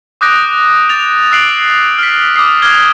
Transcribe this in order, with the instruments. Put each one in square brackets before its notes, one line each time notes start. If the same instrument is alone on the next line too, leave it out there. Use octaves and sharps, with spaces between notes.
[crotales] D6 D#6 F#6 G6 A#6 D7
A6 F7
E6 F#6 C7 D7 F#7
F6 B6
D6 D#6 C7
D6 F6 G#6 G7